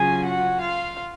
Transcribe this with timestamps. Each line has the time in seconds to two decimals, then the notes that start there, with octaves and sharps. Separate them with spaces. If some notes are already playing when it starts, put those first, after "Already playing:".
Already playing: C#3 F#3 C#4 F4 G#4 G#5
0.25 F#4 F#5
0.61 F4 F5